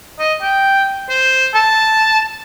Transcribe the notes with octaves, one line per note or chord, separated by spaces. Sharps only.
D#5
G5
C5
A5